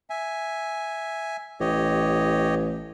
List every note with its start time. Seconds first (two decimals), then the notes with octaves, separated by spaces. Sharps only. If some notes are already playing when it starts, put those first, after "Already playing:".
0.10 E5 G#5
1.60 A1 G4 C#5 D#5